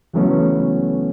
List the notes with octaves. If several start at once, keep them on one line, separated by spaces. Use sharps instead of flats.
C#2 E3 F#3 A3 B3 C#4